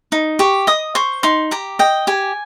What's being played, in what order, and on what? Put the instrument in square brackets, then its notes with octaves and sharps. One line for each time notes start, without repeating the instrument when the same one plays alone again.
[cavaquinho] D#4
G4 C#6
D#5 D#6
C5 C#6
D#4 C6
G4 A#5
D#5 G5
G4 G#5